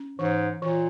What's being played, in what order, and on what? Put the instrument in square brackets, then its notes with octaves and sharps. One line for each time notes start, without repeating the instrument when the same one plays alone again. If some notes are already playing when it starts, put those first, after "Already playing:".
Already playing: [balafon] C#4
[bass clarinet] G#2 [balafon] E3
[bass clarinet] A#2 [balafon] E3